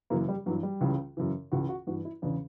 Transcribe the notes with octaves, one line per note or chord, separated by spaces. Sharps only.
F#2 C#3 E3 A#3
G3
G2 E3 F#3
G3
C#2 C#3 E3
F#2 C#3 E3
C#2 C#3 E3 F#4
F#4
G2 E3 F#4
E4
E2 C#3 E3 D4